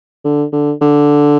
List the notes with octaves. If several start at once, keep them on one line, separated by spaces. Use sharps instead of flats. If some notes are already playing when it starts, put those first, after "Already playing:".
D3
D3
D3